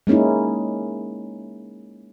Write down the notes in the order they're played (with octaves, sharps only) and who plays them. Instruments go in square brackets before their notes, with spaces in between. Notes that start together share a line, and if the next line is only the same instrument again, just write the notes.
[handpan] G#3 A#3 C#4 D#4 E4